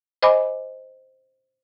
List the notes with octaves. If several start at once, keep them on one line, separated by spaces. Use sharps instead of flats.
C5 D#5 G#5 B5 D6